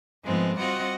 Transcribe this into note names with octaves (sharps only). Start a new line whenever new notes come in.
G#2 F3 G#3 A3 B3 C4
G3 C4 F4 F#4 D#5 F#5